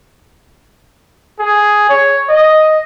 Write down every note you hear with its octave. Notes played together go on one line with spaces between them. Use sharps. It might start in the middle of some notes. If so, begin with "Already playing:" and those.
G#4
C#5
D#5